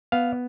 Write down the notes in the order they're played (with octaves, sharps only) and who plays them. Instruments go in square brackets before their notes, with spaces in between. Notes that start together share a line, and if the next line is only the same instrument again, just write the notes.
[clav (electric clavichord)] B3 F5